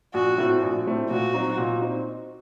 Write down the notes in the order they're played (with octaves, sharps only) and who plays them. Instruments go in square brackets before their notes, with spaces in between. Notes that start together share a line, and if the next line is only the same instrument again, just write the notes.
[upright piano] A#1 [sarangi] F#4
[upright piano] A2 A3 C4
A#1
A2 A3 C4
[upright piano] A#2 [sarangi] F#4
[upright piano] F#3 C4 D#4
A#2
C4 D#4